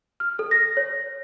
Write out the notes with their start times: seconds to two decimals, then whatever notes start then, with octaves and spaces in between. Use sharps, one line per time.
0.20 F6
0.39 A4
0.51 A#6
0.77 C#5